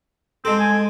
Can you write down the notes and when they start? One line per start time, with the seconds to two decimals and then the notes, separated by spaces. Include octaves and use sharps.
0.45 G#3 C4 A4
0.60 G#5